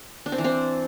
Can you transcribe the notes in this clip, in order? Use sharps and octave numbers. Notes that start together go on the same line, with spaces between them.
D4
C4
E3
C4